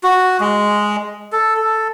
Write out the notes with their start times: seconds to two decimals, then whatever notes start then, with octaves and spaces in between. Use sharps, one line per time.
0.03 F#4
0.40 G#3
1.32 A4
1.56 A4